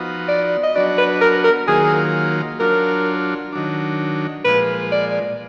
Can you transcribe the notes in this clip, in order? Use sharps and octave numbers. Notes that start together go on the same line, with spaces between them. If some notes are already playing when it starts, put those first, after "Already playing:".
Already playing: F3 B3 D#4 F#4
D5
D#5
F#3 B3 D4 F#4 D5
B4
A#4
A#4
D#3 F#3 A#3 F4 G#4
F#3 D4 F4 A#4
D#3 F#3 D4
A#2 F3 G#3 B4
D5